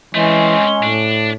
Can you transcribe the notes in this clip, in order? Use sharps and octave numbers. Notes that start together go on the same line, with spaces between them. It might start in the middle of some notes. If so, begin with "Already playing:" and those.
E3 G#3 A3 C4 C#4
A2 D4